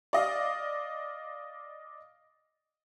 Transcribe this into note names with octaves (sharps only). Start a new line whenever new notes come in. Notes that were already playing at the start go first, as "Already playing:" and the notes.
D5 D#5 F5